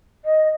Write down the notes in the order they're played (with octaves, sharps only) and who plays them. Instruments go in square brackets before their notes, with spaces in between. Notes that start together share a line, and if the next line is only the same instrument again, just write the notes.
[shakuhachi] D#5